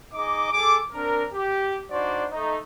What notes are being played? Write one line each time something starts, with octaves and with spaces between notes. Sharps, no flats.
D#4 G#4 D#5 D6
G#4 A4 D6
C4 D4 A#4
G4
D4 D#4 F#4 C5 D5
A3 D#4